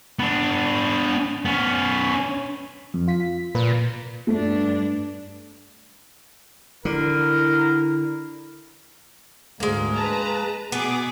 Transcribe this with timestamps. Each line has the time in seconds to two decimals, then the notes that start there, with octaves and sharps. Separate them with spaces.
0.19 B3 D4
1.45 B3 C#4
2.94 F2
3.08 F4 B6
3.55 A#2 B4
4.27 G2 A3 D4
6.85 D3 E4 A#4
9.60 D2 G#2 G#3 A#3
9.94 B4 A5 A#5
10.72 B2 B3 G#4 D6